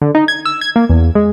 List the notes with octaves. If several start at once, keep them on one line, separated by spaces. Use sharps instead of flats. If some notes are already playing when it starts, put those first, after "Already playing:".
D3
D#4
G#6
E6
G#6
A#3
E2
G#3